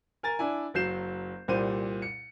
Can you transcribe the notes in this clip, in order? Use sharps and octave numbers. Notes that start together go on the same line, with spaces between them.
A#4 G#5 A#5 A6
D4 E4 G#5
F#1 F#3 G6 C7 E7
C2 A#2 G3 C5 D#7
C#7